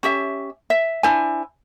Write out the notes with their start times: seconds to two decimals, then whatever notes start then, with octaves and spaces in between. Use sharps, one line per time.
0.03 C#4 G4 E5
0.70 E5
1.03 D4 E4 C5 G#5